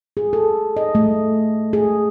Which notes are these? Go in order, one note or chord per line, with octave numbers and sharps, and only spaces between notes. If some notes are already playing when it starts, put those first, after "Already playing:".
G#4
A4
D#5
A3
G#4